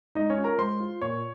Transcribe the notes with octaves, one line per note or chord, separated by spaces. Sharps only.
G#3 D#4 D#5
C#4 C#5
F4
A#4 A#5
G#3 C5 C6
F4
A#2 C#5 C#6